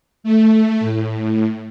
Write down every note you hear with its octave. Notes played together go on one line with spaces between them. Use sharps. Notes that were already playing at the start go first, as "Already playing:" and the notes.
A3
A2
A2